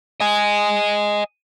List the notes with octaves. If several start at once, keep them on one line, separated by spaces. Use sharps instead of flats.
D#5 G#5